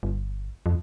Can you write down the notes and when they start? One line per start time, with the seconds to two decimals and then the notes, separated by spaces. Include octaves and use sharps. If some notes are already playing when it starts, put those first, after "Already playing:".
0.03 G1
0.66 F2